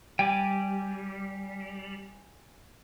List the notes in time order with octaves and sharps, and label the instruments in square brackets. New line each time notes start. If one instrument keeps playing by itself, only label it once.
[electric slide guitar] G3 [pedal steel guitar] G5 G#5 D6